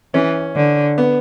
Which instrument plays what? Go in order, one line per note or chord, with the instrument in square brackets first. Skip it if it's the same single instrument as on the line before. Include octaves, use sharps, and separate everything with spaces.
[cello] E3 [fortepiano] C#4
[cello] D3
[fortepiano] B3